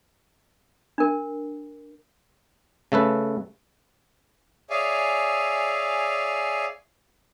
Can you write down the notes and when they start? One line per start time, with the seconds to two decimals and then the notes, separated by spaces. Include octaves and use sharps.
0.98 D4 A#4
2.92 C#3 A3 A4 B4
4.70 G#4 C#5 D5 E5 F5 G#5